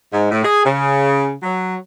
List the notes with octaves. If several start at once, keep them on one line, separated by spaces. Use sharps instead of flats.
G#2
A2
G#4
C#3
F#3